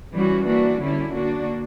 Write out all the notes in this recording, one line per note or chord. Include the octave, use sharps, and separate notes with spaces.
E3 G3 C#4 F#4
E3 A#3 D4 F#4
D3 G3 C#4 E4
D3 A#3 D4 F#4